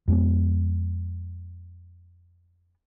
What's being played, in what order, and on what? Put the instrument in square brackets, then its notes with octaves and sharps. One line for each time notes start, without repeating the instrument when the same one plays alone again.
[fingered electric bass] F2 G#3 B3